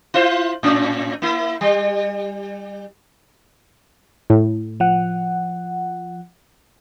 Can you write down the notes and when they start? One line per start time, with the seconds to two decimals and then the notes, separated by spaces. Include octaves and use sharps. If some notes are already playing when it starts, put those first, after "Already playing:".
0.14 E4 F4 C5
0.63 A2 C#4
1.22 A#3 E4
1.61 G3
4.30 A2
4.80 F3 F#5